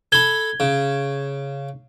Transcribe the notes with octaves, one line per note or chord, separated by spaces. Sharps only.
A4 B5 G#6 G7
C#3